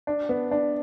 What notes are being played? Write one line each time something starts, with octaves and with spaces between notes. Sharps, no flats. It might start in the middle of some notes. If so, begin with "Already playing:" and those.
D4
B3
D4